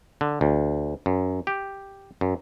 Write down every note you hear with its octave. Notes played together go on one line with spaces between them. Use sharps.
D3
D2
F#2
G4
F#2